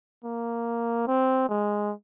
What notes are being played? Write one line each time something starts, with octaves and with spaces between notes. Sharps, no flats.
A#3
C4
G#3